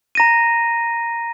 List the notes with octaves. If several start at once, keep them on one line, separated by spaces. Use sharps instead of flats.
A#5 A#6 D#7